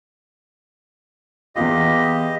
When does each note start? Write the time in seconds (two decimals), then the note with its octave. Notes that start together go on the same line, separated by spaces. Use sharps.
1.56 E2 B3 F4 G4 D#5